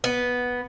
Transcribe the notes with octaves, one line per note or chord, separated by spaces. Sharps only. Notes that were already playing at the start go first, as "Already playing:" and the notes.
B3